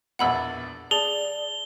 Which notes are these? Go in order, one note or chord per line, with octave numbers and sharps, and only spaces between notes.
A#1 E2 B2 F#5 B5 E6
G#4 D5 A5 G7